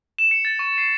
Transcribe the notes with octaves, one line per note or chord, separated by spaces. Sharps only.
E7
C#7
A6
C#6
C7